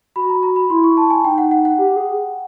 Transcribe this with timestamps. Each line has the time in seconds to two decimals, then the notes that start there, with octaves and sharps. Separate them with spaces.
0.16 F#4 B5
0.30 A#5
0.43 A#5
0.56 B5
0.70 E4 C6
0.84 C#6
0.97 A5
1.10 G#5
1.24 D#4 G5
1.38 F#5
1.51 F#5
1.65 F#5
1.78 G4
1.96 G#4